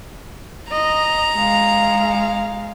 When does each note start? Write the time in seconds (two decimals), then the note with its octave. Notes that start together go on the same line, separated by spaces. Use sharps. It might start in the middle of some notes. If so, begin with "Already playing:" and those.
0.72 D#5 A#5
1.35 G#3 F5